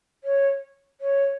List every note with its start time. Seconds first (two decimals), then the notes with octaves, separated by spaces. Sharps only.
0.24 C#5
1.01 C#5